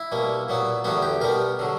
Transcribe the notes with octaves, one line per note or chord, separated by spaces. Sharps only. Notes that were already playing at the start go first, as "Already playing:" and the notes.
Already playing: E4
B2 G3 A#3
A#2 F#3 B3
E2 D3 G3 B3 F#4
G4
B2 G3 B3 A#4
D3 F#3